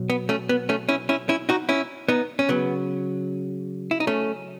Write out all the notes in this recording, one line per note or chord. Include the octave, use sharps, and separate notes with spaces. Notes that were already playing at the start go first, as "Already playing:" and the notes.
Already playing: B2 F#3
B3
A3 C#4
B3
A3 C#4
C#4 E4
C#4 E4
C#4 E4
D#4 F#4
C#4 E4
B3 D#4
C#4
C#3 F#3 B3
E4
D#4
A3 C#4